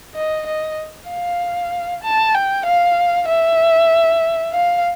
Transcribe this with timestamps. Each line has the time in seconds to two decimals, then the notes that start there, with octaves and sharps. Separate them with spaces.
0.15 D#5
0.47 D#5
1.09 F5
2.03 A5
2.34 G5
2.66 F5
3.28 E5
4.53 F5